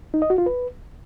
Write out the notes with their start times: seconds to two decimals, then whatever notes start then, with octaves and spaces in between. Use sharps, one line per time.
0.14 D#4
0.22 D#5
0.30 F#4
0.38 F4
0.46 B4